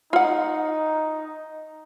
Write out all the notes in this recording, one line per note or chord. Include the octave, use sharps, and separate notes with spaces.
D#4 F4 F#5